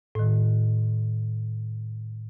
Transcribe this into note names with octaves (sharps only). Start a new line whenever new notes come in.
A2 D#3